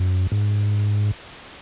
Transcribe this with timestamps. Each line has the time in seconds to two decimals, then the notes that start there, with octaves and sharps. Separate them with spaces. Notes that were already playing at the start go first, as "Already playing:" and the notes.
Already playing: F#2
0.32 G#2